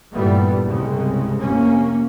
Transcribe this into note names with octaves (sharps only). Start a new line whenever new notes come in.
G2 A#2 E3 G3 A3 B3
C2 C#3 G#3
F1 C3 A#3 C#4